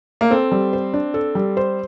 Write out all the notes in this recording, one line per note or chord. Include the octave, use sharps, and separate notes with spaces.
A#3
C4 A4
G3
C5
D4
A4
G3
C5